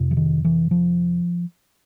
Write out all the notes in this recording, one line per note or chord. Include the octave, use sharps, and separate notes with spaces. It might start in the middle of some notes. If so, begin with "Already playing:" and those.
Already playing: F2 C3
E3
D#3
E3
F3